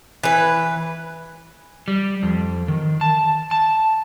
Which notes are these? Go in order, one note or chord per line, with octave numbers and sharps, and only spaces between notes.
E3 B4
G3
F2
D#3
A5
A5